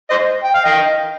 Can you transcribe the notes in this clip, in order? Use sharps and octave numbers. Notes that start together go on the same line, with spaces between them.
C5 D#5
G5
F5
D#5 G5